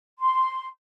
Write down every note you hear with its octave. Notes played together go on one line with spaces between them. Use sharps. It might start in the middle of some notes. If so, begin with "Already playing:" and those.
C6